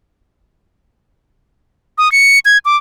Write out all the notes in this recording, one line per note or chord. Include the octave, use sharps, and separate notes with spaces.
D#6
C#7
G#6
D6